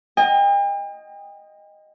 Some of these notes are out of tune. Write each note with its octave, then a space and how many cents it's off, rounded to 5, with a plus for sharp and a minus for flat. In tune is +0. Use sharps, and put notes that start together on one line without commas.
D#5 -5 G5 +45